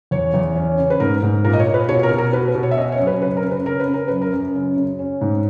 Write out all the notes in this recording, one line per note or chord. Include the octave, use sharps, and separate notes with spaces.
E2 C#5
E2
C#4
C#3
B4
G#2 A#4
G#2
A#2 A#4
D#5
C#5
A#2
B4
B2 C#5
A#4
B2
A#4
B2 B4
B4
B2
C#5
E5
C#4 D#5
C#5
F#2
B4
C#3 B4
A#4
C#3
B4
C#3 A#4
B4
C#3
A#4
F#2 B4
A#4
F#2
C#3
C#3
C#4
G#2